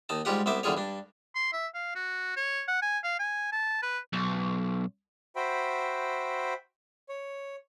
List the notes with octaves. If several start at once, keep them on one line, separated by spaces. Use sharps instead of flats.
D#2 D#4 A5
G#2 G3 F4 G4 F#5
C2 B3 C5 E5 D6
E2 D3 G3 F4 G#4 C#5
G2 D4
C6
E5
F5
F#4
C#5
F#5
G#5
F5
G#5
A5
B4
B1
F#4 C5 E5 G5 B5
C#5